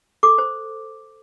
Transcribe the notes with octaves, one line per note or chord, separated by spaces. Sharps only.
A4 D6
C5